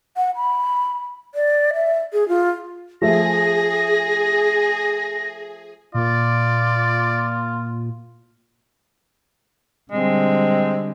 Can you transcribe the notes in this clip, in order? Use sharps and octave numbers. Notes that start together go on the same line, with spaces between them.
F#5
B5
D5
E5
G#4
F4
F3 A3 G#4 E5 A#6
A#2 F4 D5
D3 G3 G#3 C4